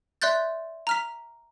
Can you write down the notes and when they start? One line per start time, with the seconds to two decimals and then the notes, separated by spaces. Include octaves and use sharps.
0.22 D5 E5 C6 F#6 G6 A6
0.87 A#5 F6 B6